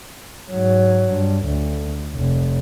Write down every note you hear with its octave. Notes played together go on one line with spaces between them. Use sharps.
G#2 F#3
G2
D2
F1